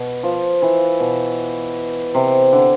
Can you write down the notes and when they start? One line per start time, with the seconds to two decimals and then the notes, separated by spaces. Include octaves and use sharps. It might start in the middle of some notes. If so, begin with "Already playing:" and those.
Already playing: B2
0.23 F3
0.62 E3
1.00 B2
2.15 C3
2.53 D3